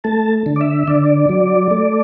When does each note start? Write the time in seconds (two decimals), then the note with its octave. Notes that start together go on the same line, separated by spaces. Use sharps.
0.04 A3 A5
0.46 D3
0.56 D5
0.61 E5
0.87 D3 D5
1.29 F#3
1.71 A3